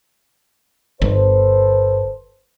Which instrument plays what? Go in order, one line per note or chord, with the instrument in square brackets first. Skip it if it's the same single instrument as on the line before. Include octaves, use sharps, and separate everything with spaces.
[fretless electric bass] G1 [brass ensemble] A4 B4 C5